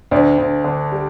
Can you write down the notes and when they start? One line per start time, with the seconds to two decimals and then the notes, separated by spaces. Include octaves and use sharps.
0.11 D2 D5
0.38 D2
0.64 D3
0.92 G3